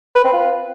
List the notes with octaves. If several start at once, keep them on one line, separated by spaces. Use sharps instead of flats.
B4
C4
F4